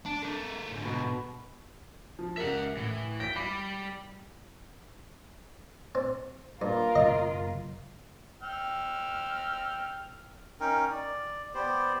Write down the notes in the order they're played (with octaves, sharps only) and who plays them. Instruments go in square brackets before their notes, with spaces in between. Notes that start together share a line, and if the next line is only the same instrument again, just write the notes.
[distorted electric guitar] D4 A5
A#3 A4
G#2 D3
[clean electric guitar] B2
[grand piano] F3
[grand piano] C#2 G4 A#4 [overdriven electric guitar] E5 F#5
[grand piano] A2 [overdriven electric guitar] E3
[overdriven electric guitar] G5 [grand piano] A#6 B6
[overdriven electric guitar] G3 [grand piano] B5 D6 A#6
[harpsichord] C4
[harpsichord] G2 [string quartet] A#3 F4 A#4
[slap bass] F#1 F#2 B2 [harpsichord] D#5
[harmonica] G5 E6 F6
[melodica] C#4 D#4 A#4 G5
D5
B3 G4 C5 D5